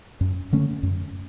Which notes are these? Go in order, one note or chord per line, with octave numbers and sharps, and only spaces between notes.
F#2
D3 A3 C#4
F#2